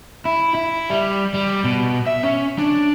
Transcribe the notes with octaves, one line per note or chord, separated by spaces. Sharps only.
E4
E4
G3
G3
B2
E5
C#4
D4